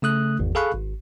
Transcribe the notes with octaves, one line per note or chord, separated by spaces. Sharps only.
C#3 A3 D#6 F#6
G#1 E2
G#4 A4 F5 B5 C#6 F#6
G#1